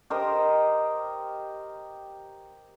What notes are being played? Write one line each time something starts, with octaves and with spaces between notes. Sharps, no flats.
G4 A#4 C5 D#5